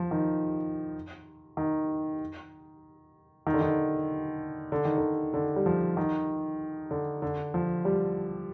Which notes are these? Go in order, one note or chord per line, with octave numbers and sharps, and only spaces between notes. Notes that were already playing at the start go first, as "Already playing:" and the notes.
Already playing: F3
D#3
D#3
D#3
D3
D#3
D3
D#3
D3
D3
G3
F3
D#3
D3
D3
F3
G3